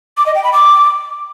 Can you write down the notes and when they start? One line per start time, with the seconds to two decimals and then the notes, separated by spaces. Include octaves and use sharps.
0.17 D6
0.26 D#5
0.35 G5
0.44 B5
0.53 D6